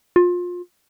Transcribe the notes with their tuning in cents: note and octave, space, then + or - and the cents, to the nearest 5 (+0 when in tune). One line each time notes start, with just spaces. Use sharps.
F4 +25